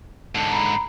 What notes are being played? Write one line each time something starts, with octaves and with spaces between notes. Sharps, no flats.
G#2 D3 A5
A#5 B5